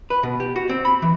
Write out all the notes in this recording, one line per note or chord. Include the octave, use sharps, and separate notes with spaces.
B4
B2
G4
F#4
C4
B5
E3